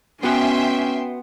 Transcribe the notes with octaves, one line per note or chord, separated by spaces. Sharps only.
B3 C#4 F#4 E5 G5 G#5 C6